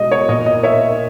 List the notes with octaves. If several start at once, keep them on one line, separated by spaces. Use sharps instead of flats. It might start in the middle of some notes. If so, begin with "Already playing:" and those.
Already playing: B2 G#3 D#5
C#5
A#2 A#3 D#5
D#5
C#5 E5